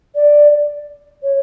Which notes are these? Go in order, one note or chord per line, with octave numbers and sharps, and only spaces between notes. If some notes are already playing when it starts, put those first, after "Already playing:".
D5
C#5